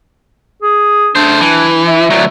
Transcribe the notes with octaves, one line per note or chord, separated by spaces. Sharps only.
G#4
A3 D4 C5
E3
E5
D2 F#3